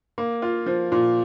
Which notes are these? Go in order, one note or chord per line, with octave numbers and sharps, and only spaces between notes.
A#3
F4
F3
A#2